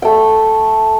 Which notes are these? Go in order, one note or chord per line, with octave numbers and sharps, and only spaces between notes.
A3 G5